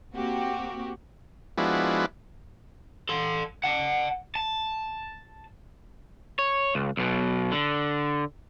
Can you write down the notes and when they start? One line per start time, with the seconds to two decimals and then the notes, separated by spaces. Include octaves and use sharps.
0.14 A#3 C4 F#4 G4
1.58 F3 G#3 B3 D4 E4 F#4
3.09 A4 C6
3.64 F#5 A5
4.35 A5
6.39 C#5
6.75 C#2
6.97 B1 B2
7.52 D3